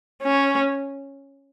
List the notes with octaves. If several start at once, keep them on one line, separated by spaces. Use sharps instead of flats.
C#4